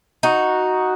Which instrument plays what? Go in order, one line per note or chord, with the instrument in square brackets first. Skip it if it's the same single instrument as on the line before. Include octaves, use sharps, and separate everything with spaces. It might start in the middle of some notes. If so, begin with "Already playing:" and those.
[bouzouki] D#4 [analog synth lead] F#4